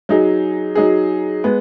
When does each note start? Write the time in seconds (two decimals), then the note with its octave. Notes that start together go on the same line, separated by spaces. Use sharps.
0.09 F#3 D#4 G#4
0.75 F#3 D#4 G#4
1.44 G#3 B3